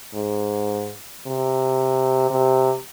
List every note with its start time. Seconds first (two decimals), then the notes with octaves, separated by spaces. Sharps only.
0.14 G#2
1.27 C3
2.30 C3